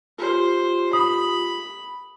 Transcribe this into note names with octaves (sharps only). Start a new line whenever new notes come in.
F4 G4 C5
B5 D#6